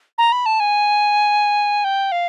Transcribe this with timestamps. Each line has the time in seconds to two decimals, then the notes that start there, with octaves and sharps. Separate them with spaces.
0.18 A#5
0.32 B5
0.46 A5
0.60 G#5
1.84 G5
2.12 F5